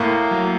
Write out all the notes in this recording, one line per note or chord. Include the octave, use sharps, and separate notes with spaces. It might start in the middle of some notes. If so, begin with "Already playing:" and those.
Already playing: A2 A#3
F#3